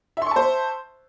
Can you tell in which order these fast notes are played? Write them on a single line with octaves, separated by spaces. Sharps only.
E5 C6 C#6 A5 C5